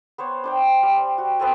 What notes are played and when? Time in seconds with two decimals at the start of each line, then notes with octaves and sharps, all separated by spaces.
0.18 B3 C5 C#5
0.44 D4 C5 G5
0.83 G3
1.18 F#4
1.40 B3 C4 A4 G#5